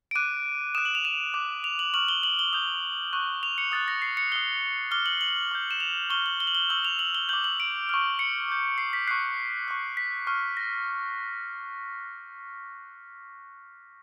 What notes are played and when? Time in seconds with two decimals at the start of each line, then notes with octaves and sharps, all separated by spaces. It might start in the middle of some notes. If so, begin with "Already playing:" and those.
0.11 D7
0.15 D6 F#6 D#7
0.75 D#6 F#6 E7
0.85 F#7
0.95 F7
1.05 E7
1.34 D6 F#6
1.64 F7
1.79 F#7
1.94 C#6 F6 F#7
2.08 G7
2.23 F#7
2.39 G7
2.53 D#6 G6 F7
3.13 C#6 F#6
3.43 F7
3.58 C#7
3.72 D#6 F#6 A6
3.88 A#6
4.02 C7
4.17 C#7
4.32 D#6 F#6 G7
4.91 D6 F6 G7
5.06 F#7
5.21 F#7
5.51 D6 G6
5.71 E7
5.80 F7
6.10 C#6 F6 G7
6.26 F#7
6.40 G7
6.47 F#7
6.55 G7
6.69 C#6 E6 G6 F#7
6.85 F7
6.99 F#7
7.15 G7
7.29 D6 G6 F#7
7.44 F#7
7.60 D7
7.89 C#6 F6
8.19 C#7
8.48 D6 G6
8.78 C7
8.93 B6
9.07 C#6 F#6 C7
9.68 C#6 F#6
9.97 B6
10.27 C#6 F6
10.57 A#6